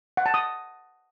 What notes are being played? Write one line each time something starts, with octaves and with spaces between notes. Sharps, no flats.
F#5
A5
D#6